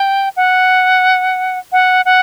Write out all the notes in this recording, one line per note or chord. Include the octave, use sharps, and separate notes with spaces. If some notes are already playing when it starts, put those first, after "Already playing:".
Already playing: G5
F#5
F#5
F#5